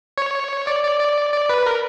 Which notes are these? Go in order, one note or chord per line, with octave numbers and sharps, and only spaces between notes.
C#5
D5
D5
D5
D5
B4
A#4